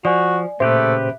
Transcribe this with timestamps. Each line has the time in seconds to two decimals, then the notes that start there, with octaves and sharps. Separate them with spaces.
0.05 F3 F#4 D5 G#5
0.60 A#2 C#3 A3 G4 B4 C5 E5